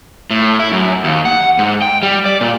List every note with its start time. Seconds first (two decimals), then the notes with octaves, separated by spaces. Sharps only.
0.30 A2
0.59 E4
0.72 F#2
1.04 D#2
1.25 F#5
1.59 G#2
1.82 G5
2.03 G3
2.26 D5
2.41 A#2